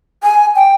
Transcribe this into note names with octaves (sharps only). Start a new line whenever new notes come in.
G#5
G5